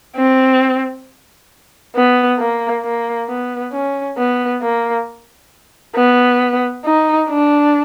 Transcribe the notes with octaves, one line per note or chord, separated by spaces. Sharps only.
C4
B3
A#3
A#3
B3
C#4
B3
A#3
B3
D#4
D4